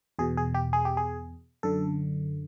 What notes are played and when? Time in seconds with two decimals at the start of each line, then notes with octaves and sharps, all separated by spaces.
0.19 E2 B2 G#4
0.37 G#4
0.55 G4
0.73 G#4
0.85 G4
0.97 G#4
1.63 F#2 D3 A4